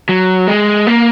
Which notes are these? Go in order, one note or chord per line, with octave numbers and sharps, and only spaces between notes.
F#3
G#3
A#3